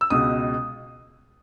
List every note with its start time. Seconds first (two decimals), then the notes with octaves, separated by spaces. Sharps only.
0.01 E6
0.10 C#2 B2 G#3 D#6